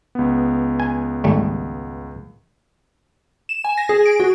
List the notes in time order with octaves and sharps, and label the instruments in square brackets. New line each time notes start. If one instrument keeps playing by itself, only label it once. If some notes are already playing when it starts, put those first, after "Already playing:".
[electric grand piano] C#2 B3
[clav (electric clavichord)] G#5
G#1 G3 A3
[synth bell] E7
G#5
A#6
G#4
D7
F#4